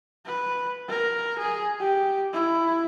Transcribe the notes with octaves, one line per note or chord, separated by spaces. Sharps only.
B4
A#4
G#4
G4
E4